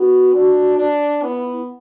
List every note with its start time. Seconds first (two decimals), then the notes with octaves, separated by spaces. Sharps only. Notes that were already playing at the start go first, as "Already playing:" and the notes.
Already playing: B3 F#4
0.34 D4
0.78 D4
1.23 B3 E4